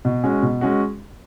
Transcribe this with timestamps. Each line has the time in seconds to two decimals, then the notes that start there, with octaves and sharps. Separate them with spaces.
0.05 B2
0.24 G#3 C#4 F#4
0.43 B2
0.61 G#3 C#4 F#4